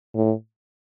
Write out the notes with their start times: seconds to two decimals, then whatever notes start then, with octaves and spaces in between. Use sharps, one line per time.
0.15 A2